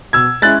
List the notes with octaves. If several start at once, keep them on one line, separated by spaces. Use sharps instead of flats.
B2 E6 G#6
G#3 C#4 E4 F#6 A6